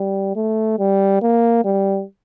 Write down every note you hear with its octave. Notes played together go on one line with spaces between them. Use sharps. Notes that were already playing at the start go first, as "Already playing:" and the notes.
Already playing: G3
A3
G3
A#3
G3